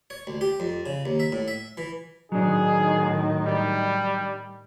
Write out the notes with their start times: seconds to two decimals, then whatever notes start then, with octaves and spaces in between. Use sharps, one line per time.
0.10 C#5
0.27 D2
0.41 G4
0.60 F2
0.86 C#3
1.05 D#2
1.20 E5
1.32 A2
1.48 E5
1.77 E3
2.32 A2 D#3 F#3 D4 D#4 G#4
3.45 G3